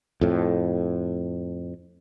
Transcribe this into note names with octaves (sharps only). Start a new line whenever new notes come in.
F2 A2